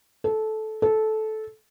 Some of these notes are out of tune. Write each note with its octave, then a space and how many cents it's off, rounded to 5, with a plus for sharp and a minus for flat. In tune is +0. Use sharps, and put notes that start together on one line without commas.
A4 -15
A4 -15